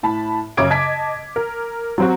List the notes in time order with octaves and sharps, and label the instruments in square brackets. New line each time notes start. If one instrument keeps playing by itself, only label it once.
[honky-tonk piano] A2 A5 B5
F#2 C#3 C#5 D6 G#6 D7
D#5 A5 G#6 B6
A#4
F#3 C4 F#4